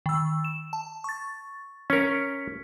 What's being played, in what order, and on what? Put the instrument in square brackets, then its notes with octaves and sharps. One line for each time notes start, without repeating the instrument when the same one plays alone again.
[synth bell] D#3 E6
E7
A5
C#6 A6
[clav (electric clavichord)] C#4 A#4 [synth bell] B6 C#7